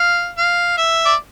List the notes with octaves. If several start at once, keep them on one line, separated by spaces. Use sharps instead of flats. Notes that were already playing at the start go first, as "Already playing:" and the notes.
Already playing: F5
F5
E5
D5